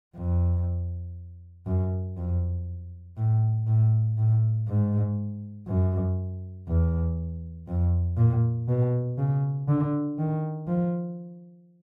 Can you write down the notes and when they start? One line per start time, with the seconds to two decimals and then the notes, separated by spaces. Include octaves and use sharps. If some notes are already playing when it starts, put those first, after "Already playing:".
0.16 F2
1.67 F#2
2.17 F2
3.17 A2
3.67 A2
4.18 A2
4.68 G#2
5.68 F#2
6.68 E2
7.68 F2
8.17 A#2
8.68 B2
9.18 C#3
9.68 D3
10.19 D#3
10.68 F3